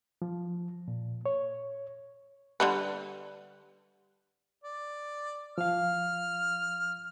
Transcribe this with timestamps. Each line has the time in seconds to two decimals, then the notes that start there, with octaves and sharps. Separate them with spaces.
0.22 F3
0.88 A#2
1.26 C#5
2.60 D3 G3 B4
4.64 D5
5.58 F3 F5 F6